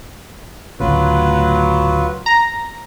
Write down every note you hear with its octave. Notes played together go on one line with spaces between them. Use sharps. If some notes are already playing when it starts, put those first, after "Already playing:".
D2 A2 C#3 F#3 F4 B4
A#5